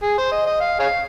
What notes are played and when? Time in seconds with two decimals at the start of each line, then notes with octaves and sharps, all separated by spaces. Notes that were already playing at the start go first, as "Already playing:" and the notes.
0.03 G#4
0.18 C5
0.32 D#5
0.46 D#5
0.61 F5
0.79 G#4 C#5 F5